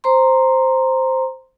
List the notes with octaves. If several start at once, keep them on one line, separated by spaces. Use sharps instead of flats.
C5 A#5 C6